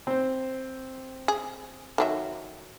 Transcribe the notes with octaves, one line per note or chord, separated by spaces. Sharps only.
C4 C5
G#4
D#3 F#3 E5